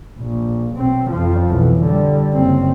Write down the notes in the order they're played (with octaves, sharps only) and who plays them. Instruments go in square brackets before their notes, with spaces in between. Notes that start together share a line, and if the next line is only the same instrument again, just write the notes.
[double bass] A#1
B1 C4
F2 F3
B1 E3
D3 G3
F#1 C4